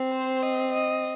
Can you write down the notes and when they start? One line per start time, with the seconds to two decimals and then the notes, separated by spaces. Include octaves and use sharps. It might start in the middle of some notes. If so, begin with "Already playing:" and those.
Already playing: C4
0.13 C5
0.43 D#5
0.73 D#5